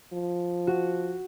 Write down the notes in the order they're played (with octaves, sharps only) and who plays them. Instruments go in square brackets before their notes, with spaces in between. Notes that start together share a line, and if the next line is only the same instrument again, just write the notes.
[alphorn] F3
[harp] F#4